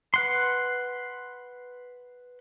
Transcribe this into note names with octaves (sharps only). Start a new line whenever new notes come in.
B4 F#5 C6